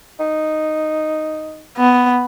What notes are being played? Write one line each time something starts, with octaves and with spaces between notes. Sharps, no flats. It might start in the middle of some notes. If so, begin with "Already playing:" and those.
D#4
B3